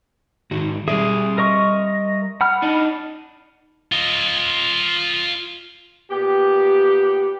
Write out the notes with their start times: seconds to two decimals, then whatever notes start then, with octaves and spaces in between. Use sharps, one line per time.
0.51 G#2 D#3 F#4
0.88 G3 G#4 D5 E5
1.38 A#4 D#5 C#6
2.41 F#5 B5 F6
2.62 D4 D#4
3.92 F4 D#5
6.11 A#2 B3 G4